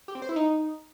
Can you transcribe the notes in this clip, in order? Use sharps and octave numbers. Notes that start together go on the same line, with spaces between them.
G4
C4
C5
E4
D#4